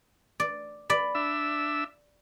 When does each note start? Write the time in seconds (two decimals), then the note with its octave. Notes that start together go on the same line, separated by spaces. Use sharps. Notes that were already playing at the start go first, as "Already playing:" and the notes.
0.40 D5
0.90 D5 B5
1.15 D4 E5 E6